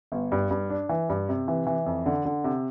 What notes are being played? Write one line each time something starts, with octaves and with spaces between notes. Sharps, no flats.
G1
G2
G2
D4
E3
G2
C3
E3
E3
F2
D3
D3
C3